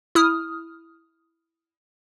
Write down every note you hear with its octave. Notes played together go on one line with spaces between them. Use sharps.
E4 D#6 F6